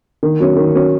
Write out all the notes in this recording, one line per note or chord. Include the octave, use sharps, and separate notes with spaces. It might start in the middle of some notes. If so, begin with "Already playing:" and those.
D#3
F#3 C#4
D#3
F#3 C#4